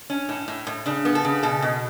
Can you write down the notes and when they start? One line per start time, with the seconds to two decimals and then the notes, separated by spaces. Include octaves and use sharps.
0.10 C#4
0.29 A2
0.48 A2
0.67 A2
0.86 C#3 D4
1.05 B3
1.15 A4
1.25 C#3
1.43 B2 A4
1.62 B2